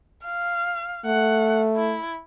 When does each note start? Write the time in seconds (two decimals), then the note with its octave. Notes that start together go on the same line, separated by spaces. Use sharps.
0.24 F5
1.06 A3 F#5
1.77 E4